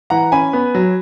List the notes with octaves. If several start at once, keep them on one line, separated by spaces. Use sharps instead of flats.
E3 F#5 A#5
C#4 G#5 B5
B3
F#3